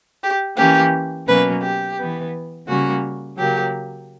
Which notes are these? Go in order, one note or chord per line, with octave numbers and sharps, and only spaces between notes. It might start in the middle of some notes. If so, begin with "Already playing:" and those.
G4
E3 A#3 C#4 G4
B2 F#3 A#3 C#4 B4
G4
E3 B3
C#3 G3 A#3 C#4 F#4
C#3 F#3 A#3 G4